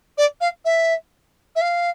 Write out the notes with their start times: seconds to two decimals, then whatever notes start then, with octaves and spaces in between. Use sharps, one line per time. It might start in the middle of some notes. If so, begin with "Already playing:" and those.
0.18 D5
0.41 F5
0.65 E5
1.56 E5
1.61 F5